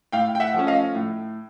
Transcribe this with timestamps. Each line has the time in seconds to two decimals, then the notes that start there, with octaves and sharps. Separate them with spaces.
0.12 A2 F5 G5
0.35 G5
0.40 E5 F#5
0.54 F3 A3 C#4
0.67 D#5 F5
0.95 A2